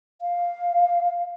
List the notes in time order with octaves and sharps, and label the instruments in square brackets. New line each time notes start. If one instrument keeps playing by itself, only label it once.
[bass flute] F5